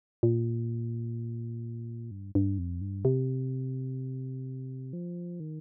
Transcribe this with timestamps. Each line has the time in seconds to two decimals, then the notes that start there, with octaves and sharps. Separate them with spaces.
0.23 A#2
2.11 G2
2.35 G2
2.58 F2
2.81 G2
3.05 C3
4.93 F3
5.40 D#3